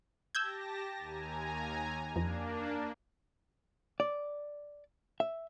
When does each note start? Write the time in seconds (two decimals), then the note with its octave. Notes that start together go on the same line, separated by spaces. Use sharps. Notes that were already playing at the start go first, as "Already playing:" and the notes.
0.35 G4 A5 E6 G6 G#6 A#6
0.98 D#2 G#5 A#5
2.16 F2 A#3 D4
4.00 D5
5.20 E5